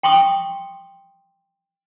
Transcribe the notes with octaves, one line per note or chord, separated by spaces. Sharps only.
G5 C6 C#6 D#6